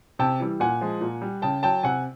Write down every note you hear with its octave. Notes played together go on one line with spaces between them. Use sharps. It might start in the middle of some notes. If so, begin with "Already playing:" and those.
C3 G5 A5
E3 G3
A#2 F#5 G#5
F3 G#3
A#2
G3
C#3 G5 A5
F#3 G5 A5
C3 F#5 G#5